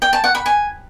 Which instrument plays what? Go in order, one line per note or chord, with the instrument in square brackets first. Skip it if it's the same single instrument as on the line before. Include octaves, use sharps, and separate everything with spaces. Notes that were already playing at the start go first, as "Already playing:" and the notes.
[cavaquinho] G5
A5
F#5
B5
G#5